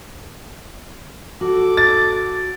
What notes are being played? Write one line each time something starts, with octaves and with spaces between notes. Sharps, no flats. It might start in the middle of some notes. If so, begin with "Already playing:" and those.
F#4 A4 D6
A6